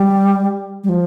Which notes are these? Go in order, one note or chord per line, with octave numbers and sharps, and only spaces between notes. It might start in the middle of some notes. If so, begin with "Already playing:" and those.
Already playing: G3
G3
F3